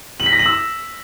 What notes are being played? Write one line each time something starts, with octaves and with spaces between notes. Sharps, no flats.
F#7
B6
A#6
F#7
E6